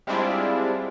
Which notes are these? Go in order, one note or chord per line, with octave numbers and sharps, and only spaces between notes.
G3 G#3 C4 D4 E4 F4